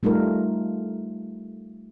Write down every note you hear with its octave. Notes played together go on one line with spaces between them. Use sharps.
G3 A3 D#4 F4 A#4